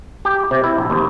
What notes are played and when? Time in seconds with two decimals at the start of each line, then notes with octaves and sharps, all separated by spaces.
0.25 G4
0.51 C3
0.64 E4
0.78 A#1
0.90 D#2